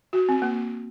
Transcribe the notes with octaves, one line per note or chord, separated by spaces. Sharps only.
F#4
C4
A#3